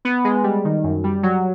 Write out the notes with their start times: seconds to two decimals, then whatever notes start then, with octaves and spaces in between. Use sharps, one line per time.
0.05 B3
0.24 G#3
0.44 G3
0.65 D#3
0.84 F#2
1.04 G3
1.23 F#3